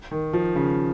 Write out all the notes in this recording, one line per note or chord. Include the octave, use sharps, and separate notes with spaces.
D#3
F3
C#3